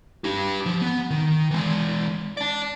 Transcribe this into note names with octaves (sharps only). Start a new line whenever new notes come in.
D4 G4
F3
B3
D#3
E3 G#3
D5 A5